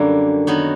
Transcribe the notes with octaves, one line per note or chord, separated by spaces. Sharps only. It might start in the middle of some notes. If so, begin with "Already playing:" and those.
Already playing: F#2 D3 G3 A#3
D#3 F#3 B3